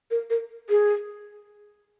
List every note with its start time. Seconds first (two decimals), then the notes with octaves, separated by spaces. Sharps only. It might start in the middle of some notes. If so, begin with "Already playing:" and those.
0.11 A#4
0.30 A#4
0.70 G#4